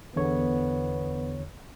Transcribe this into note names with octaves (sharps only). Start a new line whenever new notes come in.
E2 D3 B3 C#5